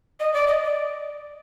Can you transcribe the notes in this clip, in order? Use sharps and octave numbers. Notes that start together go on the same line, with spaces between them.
D#5
D5
D#5
D5